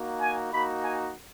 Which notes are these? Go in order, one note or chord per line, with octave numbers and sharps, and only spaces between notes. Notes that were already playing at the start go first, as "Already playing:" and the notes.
Already playing: A#3 D#4 F#4
G#5
A#3 D#4 F#4 B5
G#5